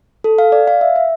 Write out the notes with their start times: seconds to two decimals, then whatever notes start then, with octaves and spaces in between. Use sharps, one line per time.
0.24 A4
0.38 F5
0.52 D5
0.68 F5
0.81 E5
0.96 E5